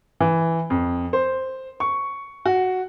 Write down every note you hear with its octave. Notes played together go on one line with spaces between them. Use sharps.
E3
F2
C5
C#6
F#4